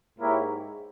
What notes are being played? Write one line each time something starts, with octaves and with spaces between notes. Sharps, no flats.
G#2 A#3 E4 G4 A#4 C#5